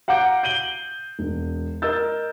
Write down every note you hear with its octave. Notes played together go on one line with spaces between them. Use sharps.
F5 F#5 A#5 D6 G6 D7
G6 D7 D#7 F#7 G7
E1
A#4 D#5 E6 G6 A6